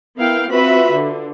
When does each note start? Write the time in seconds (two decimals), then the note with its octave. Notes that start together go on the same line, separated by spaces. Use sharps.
0.16 B3 E4 A#4 F5 G5
0.48 C4 F4 F#4 B4 E5 B5
0.91 D3